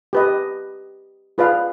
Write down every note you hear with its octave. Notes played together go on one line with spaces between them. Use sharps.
G4 B4 D#5
F4 G#4 B4 D5 F5